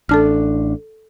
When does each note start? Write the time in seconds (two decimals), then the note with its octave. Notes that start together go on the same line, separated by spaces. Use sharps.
0.09 A1 D4 A4 A5 F6